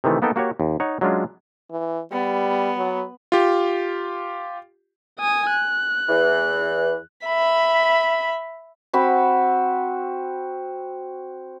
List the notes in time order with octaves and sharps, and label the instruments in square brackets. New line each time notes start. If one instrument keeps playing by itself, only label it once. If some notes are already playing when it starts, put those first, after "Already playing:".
[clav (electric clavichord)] C3 D#3 E3 A3
A#3 B3 D#4 A4 G5
A#3 F#4 G4 C#5
D#2
D#4 C#5 F#5
F#3 G#3 C#4 D4 F4
[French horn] E3
[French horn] G3 [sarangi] B3
[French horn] F#3
[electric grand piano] F4 G4
[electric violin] G#5 D#6
F#6
[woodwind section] E2 E3
[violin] E5 B5
[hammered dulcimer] C4 F#4 B5